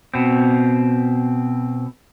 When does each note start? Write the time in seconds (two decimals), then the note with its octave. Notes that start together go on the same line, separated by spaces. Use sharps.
0.14 B2 C4